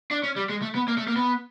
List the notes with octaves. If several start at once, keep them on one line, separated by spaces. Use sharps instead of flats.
D4
C#4
G3
G#3
A3
B3
A#3
A3
A#3
B3